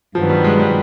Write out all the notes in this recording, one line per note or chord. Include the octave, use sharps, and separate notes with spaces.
G2 D#3 F3 F#3 B3
G3
G#3
G3